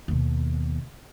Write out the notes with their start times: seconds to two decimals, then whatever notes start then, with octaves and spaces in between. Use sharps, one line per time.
0.08 D#2 B2